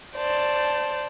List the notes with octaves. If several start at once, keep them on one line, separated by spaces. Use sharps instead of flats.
C5 D5 A5